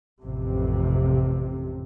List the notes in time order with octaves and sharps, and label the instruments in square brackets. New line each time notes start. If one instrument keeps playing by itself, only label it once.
[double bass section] A1 F2 C3